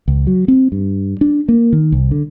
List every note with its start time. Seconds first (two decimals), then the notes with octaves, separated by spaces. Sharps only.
0.08 C#2
0.27 F#3
0.48 C4
0.72 G2
1.21 D4
1.48 A#3
1.72 D#3
1.92 C2
2.11 D3